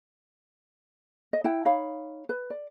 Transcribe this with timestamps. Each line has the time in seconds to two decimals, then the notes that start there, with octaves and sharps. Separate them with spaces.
1.33 D#5
1.44 E4 F#5 G5
1.65 D#4 C#5 F5 B5
2.29 B4
2.50 D5